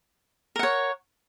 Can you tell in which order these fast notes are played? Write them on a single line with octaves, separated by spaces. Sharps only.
A#4 F#5 C#5